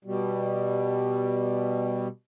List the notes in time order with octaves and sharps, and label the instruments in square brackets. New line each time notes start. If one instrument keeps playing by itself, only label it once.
[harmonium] B2 G3